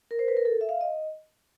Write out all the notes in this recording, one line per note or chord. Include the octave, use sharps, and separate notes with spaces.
A#4
C5
B4
A#4
A4
E5
F5
D#5